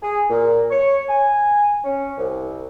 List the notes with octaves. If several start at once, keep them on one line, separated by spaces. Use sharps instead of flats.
G#4
A#2
C#5
G#5
C#4
C2